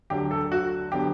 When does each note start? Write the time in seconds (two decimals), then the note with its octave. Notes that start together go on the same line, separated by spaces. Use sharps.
0.10 D2 D3 F#3 G4
0.31 A4
0.52 F#4
0.92 D3 F#3 B3 G4